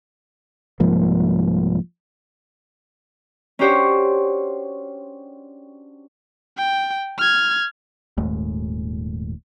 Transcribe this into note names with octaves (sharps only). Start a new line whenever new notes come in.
C2 G#2 F3 A#3
C#4 D4 F#4 G4 C5 C#5
G5
F6 G#6
D#1 D#2 G#2 A3